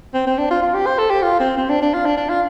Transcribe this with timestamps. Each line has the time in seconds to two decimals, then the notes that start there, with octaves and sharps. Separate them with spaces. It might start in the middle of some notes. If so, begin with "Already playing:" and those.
0.14 C4
0.27 C4
0.38 D4
0.50 F4
0.62 F4
0.74 G4
0.86 C5
0.98 A4
1.10 G4
1.22 F4
1.40 C4
1.57 C4
1.69 D4
1.82 D4
1.94 F4
2.06 D4
2.17 D4
2.29 F4